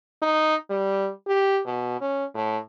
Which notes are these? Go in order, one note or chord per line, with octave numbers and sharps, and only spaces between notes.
D#4
G3
G4
B2
C#4
A2